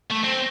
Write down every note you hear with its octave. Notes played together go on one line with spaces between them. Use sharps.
A3
C4